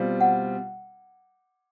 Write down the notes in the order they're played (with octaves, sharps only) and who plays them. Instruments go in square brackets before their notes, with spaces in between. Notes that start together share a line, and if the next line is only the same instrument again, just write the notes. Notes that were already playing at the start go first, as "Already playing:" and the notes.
Already playing: [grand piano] B2 G3 C4 F4
[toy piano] F#5